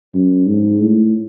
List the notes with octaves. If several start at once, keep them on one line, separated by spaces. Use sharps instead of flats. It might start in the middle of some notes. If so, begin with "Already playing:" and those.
F#2
G#2
A2